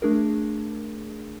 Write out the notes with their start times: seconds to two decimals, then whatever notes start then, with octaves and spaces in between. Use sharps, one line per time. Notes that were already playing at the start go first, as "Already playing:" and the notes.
0.02 A3 D4 G#4 A#4